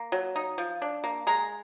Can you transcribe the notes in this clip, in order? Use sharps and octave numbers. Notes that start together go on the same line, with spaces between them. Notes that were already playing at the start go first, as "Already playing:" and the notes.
Already playing: A#3
F#3
D#4
F3
D4
A#3
G#3 A#5